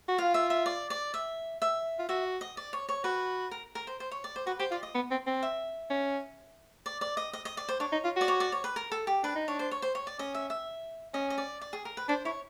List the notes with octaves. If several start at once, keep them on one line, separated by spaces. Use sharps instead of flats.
F#4
F4 F5
E5
E5
D5
D5
E5
E5
F4
F#4 E5
D#5
D5
C#5
C#5
F#4 B4
A#4
A#4
C5
C5
C#5
D5
C5
F#4 B4
G4 C5
F4 D5
D#5
B3
C4
C4
E5
C#4
D5
D5
D#5
D#5
D#5
D5
C5
D4 C#5
D#4
F4
F#4 D5
C#5
D5
C#5
B4
A#4
A4
G4
D4 B4
D#4
D4 C#5
C5
C#5
C5
C#5
D5
C#4 D#5
E5
E5
C#4 D#5
D#5
D5
D5
G#4
A#4
B4
D4 C5
E4 C#5